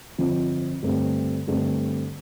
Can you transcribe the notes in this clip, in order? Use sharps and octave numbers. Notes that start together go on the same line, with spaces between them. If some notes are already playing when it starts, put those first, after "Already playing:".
G1 F2 F3
G2 D3 A3 C4 G4
G2 D3 A3 C4 G4